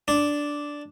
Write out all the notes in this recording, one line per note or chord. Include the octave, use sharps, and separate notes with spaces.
D4